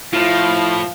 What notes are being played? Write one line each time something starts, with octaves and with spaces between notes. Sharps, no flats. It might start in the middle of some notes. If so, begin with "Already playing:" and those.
A2 F3 E4 F4 F5